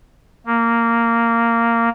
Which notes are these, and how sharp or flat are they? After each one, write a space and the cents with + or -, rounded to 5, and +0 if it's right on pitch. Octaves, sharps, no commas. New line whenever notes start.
A#3 -10